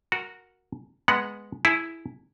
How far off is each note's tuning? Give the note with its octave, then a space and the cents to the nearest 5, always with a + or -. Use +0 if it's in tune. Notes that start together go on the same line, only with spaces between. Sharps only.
F#4 -10 A#4 +0
G#3 +0 B3 +0 F#5 +0
E4 +0 G#4 +20